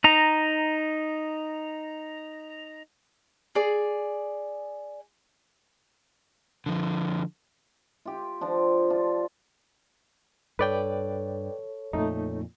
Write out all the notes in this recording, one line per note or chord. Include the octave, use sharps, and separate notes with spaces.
D#4 A#5
G#4 D5
D3 F3
F4 G4
F3 D4
D4 F4
G2 A4 B4 C#5 D5 G5
F2 A#2 A3 D#4